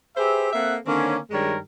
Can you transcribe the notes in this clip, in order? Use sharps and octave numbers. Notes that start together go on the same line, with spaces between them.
G4 G#4 B4 C5 E5
A#3 C4 A4 E5 F#5
D3 D#3 A#3 C4 C#4
G2 D#3 G3 G#3 A#4 C#5